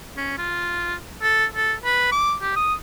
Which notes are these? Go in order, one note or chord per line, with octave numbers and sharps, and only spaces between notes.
C#4
F4
A4
A4
B4
D6
G4
D#6